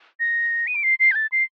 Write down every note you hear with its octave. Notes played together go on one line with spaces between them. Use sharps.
A#6
D#7
D7
C7
C7
G6
A6
C7